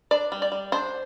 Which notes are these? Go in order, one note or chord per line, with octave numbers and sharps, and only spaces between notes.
D4 D5
G3
D5
G3
D4 C5